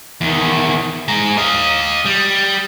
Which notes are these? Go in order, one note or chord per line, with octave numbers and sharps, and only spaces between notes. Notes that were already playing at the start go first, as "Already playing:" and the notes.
E2 D#3
G#3 A#5
D#5 F5
G3